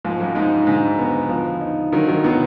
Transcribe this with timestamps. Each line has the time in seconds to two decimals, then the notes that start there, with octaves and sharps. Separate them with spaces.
0.05 G#2 F3
0.20 F#2
0.35 G#2 D#4
0.67 G#2 D3
0.99 B3
1.29 F3
1.61 D#4
1.92 D3 D#3 F#3
2.08 D#3 F#3
2.24 B2 B3